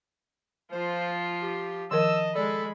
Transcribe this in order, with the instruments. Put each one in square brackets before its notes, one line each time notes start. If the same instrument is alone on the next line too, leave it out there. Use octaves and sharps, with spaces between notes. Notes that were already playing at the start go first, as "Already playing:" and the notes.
[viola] F3 F4 [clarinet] C5
[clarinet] G4
[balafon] D#3 F3 A#4 [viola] D#5 A5 [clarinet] E6
[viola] G#3 B5 [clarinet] A4 [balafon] D5